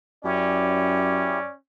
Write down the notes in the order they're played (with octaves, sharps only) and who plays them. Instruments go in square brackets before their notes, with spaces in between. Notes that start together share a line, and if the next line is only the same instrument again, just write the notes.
[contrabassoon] F#2 [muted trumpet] C#4 [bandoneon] E4 G4 [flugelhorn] D5